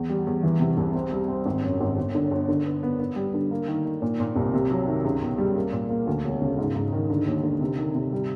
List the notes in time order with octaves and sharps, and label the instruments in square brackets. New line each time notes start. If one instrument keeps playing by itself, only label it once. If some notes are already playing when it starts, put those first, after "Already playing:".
Already playing: [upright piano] E2
G3
E2
E3
C3
C2
C4
G3
C4
G#1
F#2
G#1
G1
D3
G1
D3
B3
B3
B3
G3
D3
A#3
D#3
D#3
A#2
A#2
C2
C3
F#3
D#3
C#2
B2
G3
A#3
A#2
A#3
D2
E1
C#3
G#2
G#2
D#3
D3
D#2
D3
C3
D#3
C3
G3